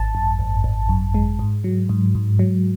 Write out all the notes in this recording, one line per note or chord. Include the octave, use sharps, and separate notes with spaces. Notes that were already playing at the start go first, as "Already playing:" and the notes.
Already playing: G#1 A5
F#2
G#1
G#1
F#2
G#3
G#2
F#3
G#2
G#2
F#3